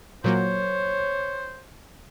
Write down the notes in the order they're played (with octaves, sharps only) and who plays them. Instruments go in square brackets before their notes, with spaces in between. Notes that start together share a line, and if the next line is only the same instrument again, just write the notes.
[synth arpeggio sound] A#2 F#3 A#3 [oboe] C5 [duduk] C#5